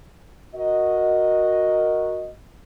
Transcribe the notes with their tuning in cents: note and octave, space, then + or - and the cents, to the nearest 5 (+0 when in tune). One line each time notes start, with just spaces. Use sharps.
F#4 -10 A#4 +0 D#5 +0